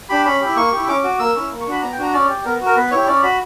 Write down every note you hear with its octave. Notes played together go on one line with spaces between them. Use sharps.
D4 G4 B5
C#4 B5
E4 G4
A#3 C#6
E4 G4
C#4 D6
F#4
A#3 E6
C#4 E4
A#3
C#6
D4 F#4 B5
B3 A#5
G5
D4 F#4 A#5
C#4 D5
G4
B3 A#4
F#4
A#4
B3 B4
E4 G4 C#5
C#4 D5
F#4 B5